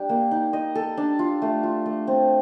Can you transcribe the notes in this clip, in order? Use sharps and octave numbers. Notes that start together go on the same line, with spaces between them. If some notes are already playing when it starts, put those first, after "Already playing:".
Already playing: G3 D4 G4 D5
A#3
D#4
D#5
A4
D4
F4
A3
F4
A3
C4